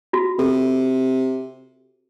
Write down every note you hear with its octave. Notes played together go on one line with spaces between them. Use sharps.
F4 F#4
C3 A4